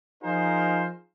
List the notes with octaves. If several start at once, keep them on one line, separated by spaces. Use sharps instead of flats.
F3 D#4 F4 G#4 A#4 C5